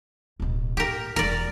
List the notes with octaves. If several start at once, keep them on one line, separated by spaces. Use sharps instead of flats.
D1 B2
A#3 G4 A#4
E1 E2 A#4 D5